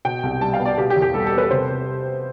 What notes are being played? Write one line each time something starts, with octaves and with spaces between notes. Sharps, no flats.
B2 G5
C2
G3 A5
F5
B3
D5
B2 G4
G4
E2
G4
G3 A4
A4
B3
B4
C3 C5